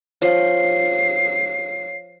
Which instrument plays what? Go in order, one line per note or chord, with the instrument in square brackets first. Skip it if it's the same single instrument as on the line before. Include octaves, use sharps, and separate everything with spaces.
[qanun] F3 [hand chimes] C#5 F5 [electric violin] C7